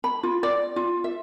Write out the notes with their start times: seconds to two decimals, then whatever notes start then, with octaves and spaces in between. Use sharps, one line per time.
0.04 B5
0.23 F4
0.43 D5
0.76 F4
1.04 E5